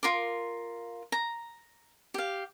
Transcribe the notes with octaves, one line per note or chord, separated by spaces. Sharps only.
F4 A#4 C6 D6
A#5
G4 F5